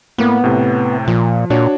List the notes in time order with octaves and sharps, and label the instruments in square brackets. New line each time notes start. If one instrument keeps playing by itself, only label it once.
[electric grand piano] A2 A#3 [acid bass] B3
[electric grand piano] A2 C3
[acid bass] A#2 [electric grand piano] F3
[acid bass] A#2 [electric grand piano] D4 F#4 C#5